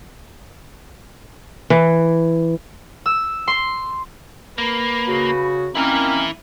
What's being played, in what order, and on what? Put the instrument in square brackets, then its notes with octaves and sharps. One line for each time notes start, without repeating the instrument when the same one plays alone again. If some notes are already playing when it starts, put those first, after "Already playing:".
[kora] E3
[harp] E6
C6
[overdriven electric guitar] A#3 [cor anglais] B4
[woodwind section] C#3 F#4
[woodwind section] D#3 C4 C#4 [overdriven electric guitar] E3 E4 [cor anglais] A#3